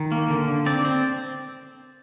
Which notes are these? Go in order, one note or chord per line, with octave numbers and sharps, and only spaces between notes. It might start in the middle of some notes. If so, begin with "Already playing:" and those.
Already playing: D#3
A#3
D3
D3
C4 D5
C4